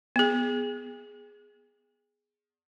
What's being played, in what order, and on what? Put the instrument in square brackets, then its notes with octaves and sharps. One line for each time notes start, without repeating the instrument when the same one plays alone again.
[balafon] B3 G#4